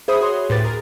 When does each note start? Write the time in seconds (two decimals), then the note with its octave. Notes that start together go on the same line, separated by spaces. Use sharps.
0.08 G#4 C5 E5 B5 D#6
0.21 F#4 G#4 C#5 C6
0.49 D2 A2 G4 B4 A6
0.64 G#4 A#4